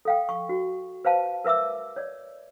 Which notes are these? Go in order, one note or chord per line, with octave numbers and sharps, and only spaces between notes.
A4 F5 G5
C#6
F#4
B4 C5 F5 A5
A#4 B4 E5 D6 E6
C#5 D5